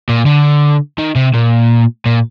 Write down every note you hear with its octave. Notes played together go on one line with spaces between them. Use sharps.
A#2
D3
D#3
C3
A#2
A#2